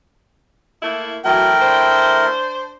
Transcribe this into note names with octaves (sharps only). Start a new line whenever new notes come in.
A3 A#3 E4
E3 F#3 A3 E4 A#4 G5
D4 C5